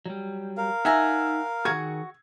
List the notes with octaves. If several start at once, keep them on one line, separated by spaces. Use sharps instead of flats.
F#3 G3
A#4 F5
D#4 E5 F#5 G#5 A#5 E6
D#3 F3 F#4 G#4 C#6 G#6